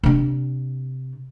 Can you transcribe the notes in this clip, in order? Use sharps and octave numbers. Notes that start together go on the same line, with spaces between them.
C3 D4